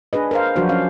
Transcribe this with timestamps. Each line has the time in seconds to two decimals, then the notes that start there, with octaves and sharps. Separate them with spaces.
0.13 D4 G#4 B4 D#5
0.31 A#4 C5 F5
0.56 F3 F#3 D4 F#4 C5
0.69 C#4 F5